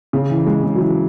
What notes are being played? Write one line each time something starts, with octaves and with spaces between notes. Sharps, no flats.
C#3
E3
G#3
C#3
F#3
E3